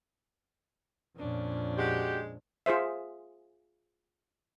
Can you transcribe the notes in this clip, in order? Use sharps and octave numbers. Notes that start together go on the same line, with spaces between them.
F2 A#2 C#4 D4
G#3 F#4 G4
F4 G#4 C5 E5